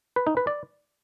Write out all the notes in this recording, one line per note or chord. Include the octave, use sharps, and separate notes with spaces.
B4
D#4
B4
D5